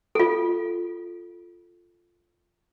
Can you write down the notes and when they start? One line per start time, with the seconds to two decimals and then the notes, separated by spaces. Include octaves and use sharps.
0.15 F4 A4